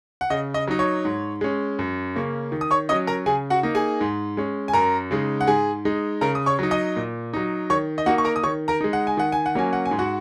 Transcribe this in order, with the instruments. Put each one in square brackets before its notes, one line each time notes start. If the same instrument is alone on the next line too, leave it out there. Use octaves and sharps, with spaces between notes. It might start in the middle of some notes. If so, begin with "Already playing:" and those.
[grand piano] F#5
C#3 D#5
D#5
F#3 D#4
C#5
G#2
G#3 C#4
F#2
C#3 A#3 C#4
D#3
D#6
C#5 C#6
F#3 C#4 D#5 D#6
A#4 A#5
C#3 G#4 G#5
F#4 F#5
A#3 D#4
G#4 G#5
G#2
G#3 C#4
G#5
F#2 A#4 A#5
C#3 G#3 D#4
F#5
G#2 G#4 G#5
G#3 D#4
C#3 A#4 A#5
D#6
C#5 C#6
F#3 D#4
D#5 D#6
A#2
F#3 D#4
D#3 C#5 C#6
D#5
A#3 D#4 F#4 F#5
C#6
A#4 A#5
D#6
D#3 C#5 C#6
A#4 A#5
G#3 D#4
F#5
G#5
D#3 F#5
G#5
F#5
F#3 A#3 C#4 G#5
F#5
G#5
G#2
F#4 F#5